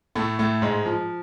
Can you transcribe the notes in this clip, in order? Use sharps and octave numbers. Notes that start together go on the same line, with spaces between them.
A2 A3
A2 A3
G#2 G#3
F3